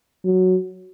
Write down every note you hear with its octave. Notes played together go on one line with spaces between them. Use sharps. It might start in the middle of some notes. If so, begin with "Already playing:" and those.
F#3